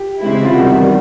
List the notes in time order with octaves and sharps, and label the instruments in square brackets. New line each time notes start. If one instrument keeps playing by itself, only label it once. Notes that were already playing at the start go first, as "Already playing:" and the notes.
Already playing: [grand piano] G4
[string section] C#3 E3 G#3 C4 E4
[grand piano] F4
[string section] E2 C3 D#3 G3 [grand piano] F#4